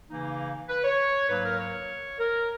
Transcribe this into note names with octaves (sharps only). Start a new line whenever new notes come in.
C#3 E3 A#3 D#4
B4
C#5
G#2 F#3 A#3 B4
A#4
C#5
A#4